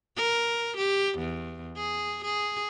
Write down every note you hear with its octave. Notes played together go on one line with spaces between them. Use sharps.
A#4
G4
E2
G#4
G#4